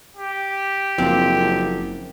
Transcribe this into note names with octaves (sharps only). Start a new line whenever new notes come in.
G4
F#1 F3 A#3 C4